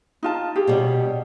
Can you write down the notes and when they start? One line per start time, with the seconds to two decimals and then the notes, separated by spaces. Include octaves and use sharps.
0.23 D#4 F4 A5
0.56 G4 G#4
0.67 B2 G3 C#4